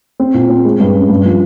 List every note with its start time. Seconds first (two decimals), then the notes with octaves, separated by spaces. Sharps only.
0.20 C4
0.34 A#2
0.50 C4
0.64 G#3
0.80 G2
0.94 C#4
1.09 G2
1.25 F3